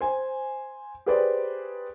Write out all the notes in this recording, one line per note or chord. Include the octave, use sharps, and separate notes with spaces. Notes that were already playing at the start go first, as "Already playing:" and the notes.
C5 G#5
G4 G#4 B4 C5 D5